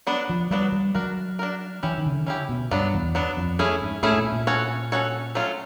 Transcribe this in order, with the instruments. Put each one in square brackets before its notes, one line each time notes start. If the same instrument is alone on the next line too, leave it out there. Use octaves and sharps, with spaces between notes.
[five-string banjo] F#3 B3 D4 F#4
[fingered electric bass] F3
[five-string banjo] F#3 B3 D4 F#4 [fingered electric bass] G3
[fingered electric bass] G3
[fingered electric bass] F#3 [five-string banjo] D4 F#4 A#4
[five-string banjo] D4 F#4 A#4
[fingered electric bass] E3 [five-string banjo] C#4 E4 G4
[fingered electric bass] D#3
C#3
D3
[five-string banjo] C#4 E4 G4
[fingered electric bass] B2
[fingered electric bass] G2 [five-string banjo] F#3 B3 D4
[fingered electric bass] E2
[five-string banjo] F#3 B3 D4
[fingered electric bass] F2
[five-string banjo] A3 C#4 E4 G#4
[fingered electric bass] G#2
[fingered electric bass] A2 [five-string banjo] A3 C#4 E4 G#4
[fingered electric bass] A#2
A#2
[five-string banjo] C#4 F#4 A4 C#5
C#4 F#4 A4 C#5
F#3 A3 C#4 F4